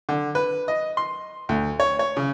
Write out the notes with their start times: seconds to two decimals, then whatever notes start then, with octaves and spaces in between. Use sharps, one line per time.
0.09 D3
0.35 B4
0.68 D#5
0.97 C6
1.49 D2
1.80 C#5
1.99 C#5
2.17 C#3